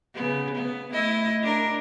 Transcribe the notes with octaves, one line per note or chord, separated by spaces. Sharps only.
C#3 B3
B3
A3 E4 D#5
D4 A#4